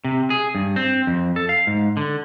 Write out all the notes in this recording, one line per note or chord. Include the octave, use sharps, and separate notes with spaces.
C3
G#4
G2
C4
F2
A4
F5
G#2
D3